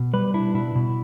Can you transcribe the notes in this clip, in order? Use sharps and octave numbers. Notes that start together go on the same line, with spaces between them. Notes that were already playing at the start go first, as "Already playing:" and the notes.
Already playing: B2
G3 B4
D4 E4
B2 E4
B2